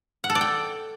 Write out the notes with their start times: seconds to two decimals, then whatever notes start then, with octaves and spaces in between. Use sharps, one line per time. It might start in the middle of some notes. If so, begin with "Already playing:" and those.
0.24 F#5
0.30 A4
0.35 D5
0.41 G5